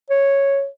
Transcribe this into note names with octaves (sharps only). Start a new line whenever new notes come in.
C#5